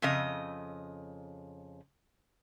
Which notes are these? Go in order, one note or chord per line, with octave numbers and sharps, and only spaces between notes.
F2 C#3 D#5